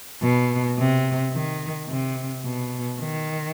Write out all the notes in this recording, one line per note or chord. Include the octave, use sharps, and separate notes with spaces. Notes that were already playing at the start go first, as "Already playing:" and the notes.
B2
C3
D#3
C3
B2
D#3